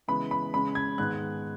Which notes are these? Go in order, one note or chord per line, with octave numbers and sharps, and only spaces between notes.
C#3 E3 G#3 B3 B5
B5
C#3 G#3 C#4 B5
G#6
G#2 D#3 G#3 B3 F#6